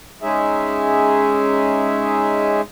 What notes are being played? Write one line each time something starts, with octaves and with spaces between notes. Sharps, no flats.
G#3 C#4 D#4 G#4 E5